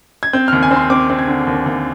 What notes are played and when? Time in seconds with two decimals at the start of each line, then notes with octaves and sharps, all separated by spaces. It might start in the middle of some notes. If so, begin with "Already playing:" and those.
0.23 G#6
0.33 C4 G6
0.48 D#2 F6
0.63 G#5
0.71 C4
0.76 C6
0.90 C4 D6
1.10 C4
1.19 G#6
1.27 D3
1.47 D#2
1.66 D#2